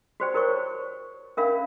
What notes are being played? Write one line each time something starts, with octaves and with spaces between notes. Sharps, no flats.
F#4 G4 C5 D5 G5
E4 A#4 C5 C#5 C#6
C#4 D4 A#4 E5 F5 B5